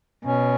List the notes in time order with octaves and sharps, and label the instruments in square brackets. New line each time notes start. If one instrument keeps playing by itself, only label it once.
[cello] B2 [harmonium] C#4